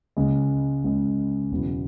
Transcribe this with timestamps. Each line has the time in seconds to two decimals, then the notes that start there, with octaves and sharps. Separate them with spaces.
0.16 C#2 C#3 G#3
0.84 C#2 C#3 G#3
1.51 E1 E2 C#3 F#3